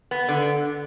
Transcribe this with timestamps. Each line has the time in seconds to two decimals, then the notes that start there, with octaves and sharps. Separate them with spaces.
0.11 B3
0.29 D3